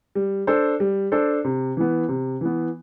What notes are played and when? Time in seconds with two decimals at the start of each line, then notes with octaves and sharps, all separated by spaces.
0.15 G3
0.47 D4 A4 C5
0.80 G3
1.12 D4 A4 C5
1.45 C3
1.77 E3 B3
2.09 C3
2.41 E3 B3